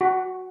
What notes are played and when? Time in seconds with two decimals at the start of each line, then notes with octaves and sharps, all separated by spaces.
0.01 F#4